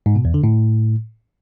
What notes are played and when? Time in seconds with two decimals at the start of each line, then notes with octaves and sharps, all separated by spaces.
0.06 G#2
0.15 B2
0.25 E2
0.34 D3
0.44 A2